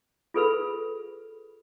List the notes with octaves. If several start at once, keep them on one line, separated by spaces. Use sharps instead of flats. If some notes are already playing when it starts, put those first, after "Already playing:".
F4 G#4 A4 B4 B5 E6